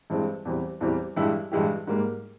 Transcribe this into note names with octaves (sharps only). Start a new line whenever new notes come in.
G2 E3 G#3 C4
E2 E3 G3 C4
E2 E3 G3 C4
G2 E3 G#3 E4 G4
G2 E3 G#3 E4 G4
G#2 G3 A#3